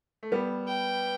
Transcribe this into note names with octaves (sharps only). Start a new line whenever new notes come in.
A3
G3 B3
G5